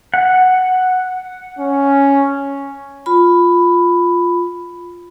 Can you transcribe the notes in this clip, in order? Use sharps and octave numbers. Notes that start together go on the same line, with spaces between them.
F#5
C#4
F4 B5